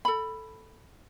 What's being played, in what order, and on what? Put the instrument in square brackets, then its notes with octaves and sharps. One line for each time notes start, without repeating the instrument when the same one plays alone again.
[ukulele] A4 B5